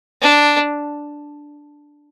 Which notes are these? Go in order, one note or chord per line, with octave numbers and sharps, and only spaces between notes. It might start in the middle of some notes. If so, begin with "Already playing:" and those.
D4